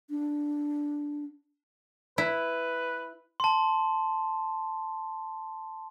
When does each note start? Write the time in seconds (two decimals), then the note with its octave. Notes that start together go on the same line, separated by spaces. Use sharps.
0.10 D4
2.18 E4 B4
3.40 A5 C6